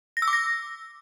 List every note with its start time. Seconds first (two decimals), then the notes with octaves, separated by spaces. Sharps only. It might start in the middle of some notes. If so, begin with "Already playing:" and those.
0.17 A#6
0.22 E6
0.28 D6
0.33 A#6